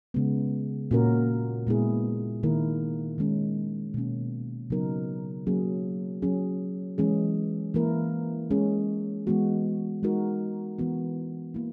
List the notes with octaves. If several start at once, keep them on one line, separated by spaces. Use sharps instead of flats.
C#3 G#3 B3
A#2 A#3 C#4 F#4 A#4
A#2 G#3 B3 E4 G#4
D#3 A#3 E4 A#4
D#3 G#3 C#4
B2 A#3 C#4
C#3 F#3 B3 D#4 A#4
F#3 A#3 C#4 G#4
F#3 C#4 G#4
E3 G#3 C#4 G#4
E3 A#3 E4 A#4
G#3 C#4 G#4
E3 G#3 B3 F#4
G#3 D#4 F#4 A#4
E3 B3 F#4
A#3 E4